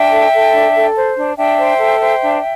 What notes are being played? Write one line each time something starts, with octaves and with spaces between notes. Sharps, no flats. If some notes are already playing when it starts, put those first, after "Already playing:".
Already playing: D4 E5 G5
A4
A4
D4
A4
C5
D4
D4 E5 G5
C5
A4
C5
D4